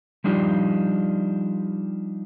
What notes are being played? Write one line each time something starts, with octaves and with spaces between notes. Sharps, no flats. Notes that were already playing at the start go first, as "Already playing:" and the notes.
F3 G3 D4 D#4 F4 G4